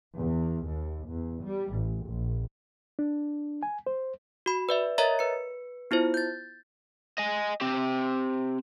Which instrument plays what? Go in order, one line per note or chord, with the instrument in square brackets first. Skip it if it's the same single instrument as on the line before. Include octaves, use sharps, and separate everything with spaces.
[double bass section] E2
D#2
E2
G3
A1
A#1
[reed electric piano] D4
G#5
C5
[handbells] F#4 B5
B4 D5 E5
A#4 C#5 D#5 E5 A#5 A6
B4 C#7
B3 E4 F4 C5
G6 A6
[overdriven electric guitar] D#5 G#5
C4 G4